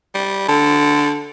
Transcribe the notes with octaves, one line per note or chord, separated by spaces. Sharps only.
G3
D3